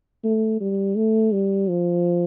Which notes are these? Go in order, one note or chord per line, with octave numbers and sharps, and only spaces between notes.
A3
G3
A3
G3
F3